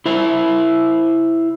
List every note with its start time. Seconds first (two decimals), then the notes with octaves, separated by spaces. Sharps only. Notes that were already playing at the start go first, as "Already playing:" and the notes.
0.06 E4 C5 E5